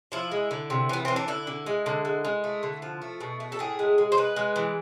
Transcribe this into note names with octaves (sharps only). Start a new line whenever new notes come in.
F3 E4
G#3
D3
C3
E3 B3
E3 C4
D4
D3 E4
D3
G#3
D3
G#3
G#3
A3
D3
F3
A3
B2
A3
A4
A2 G#4
G#3
G#3
C5
G#3 B4
G#3
E3